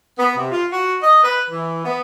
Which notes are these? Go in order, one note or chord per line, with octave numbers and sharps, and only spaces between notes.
B3
C3
F4
F#4
D#5
B4
E3
B3